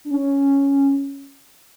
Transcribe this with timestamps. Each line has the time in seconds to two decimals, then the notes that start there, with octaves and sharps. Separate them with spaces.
0.05 D4
0.11 C#4